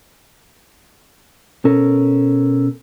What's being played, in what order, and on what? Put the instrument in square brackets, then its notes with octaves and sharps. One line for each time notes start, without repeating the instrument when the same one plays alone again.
[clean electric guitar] B2 C#4 A4 A#4